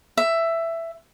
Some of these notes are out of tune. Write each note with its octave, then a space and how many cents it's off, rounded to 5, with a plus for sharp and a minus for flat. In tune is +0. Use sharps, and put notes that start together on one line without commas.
E5 +10